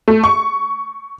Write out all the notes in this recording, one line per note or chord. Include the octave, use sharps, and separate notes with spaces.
A3
C#6